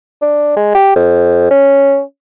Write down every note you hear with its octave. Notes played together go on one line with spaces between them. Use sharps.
D4
G#3
G4
F2
C#4